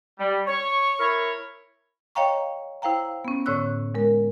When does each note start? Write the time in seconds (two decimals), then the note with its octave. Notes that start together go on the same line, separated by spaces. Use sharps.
0.19 G3
0.47 C#5 C#6
0.99 E4 A#4 C#5
2.15 C#5 D#5 F5 G5 A#5 C#6
2.82 E4 C5 F5 G5 A#5
3.25 B3 C#4
3.46 A2 D3 C#5 C#6 E6 F#6
3.95 G#3 A#4